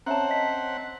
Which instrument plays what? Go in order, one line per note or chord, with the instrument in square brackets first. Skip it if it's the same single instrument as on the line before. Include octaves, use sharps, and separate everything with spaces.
[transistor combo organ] C4 F#5 [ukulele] C#4 A5 [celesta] C#5 E5 A#5
[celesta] D#5 B6